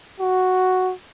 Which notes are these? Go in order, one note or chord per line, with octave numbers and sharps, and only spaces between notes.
F#4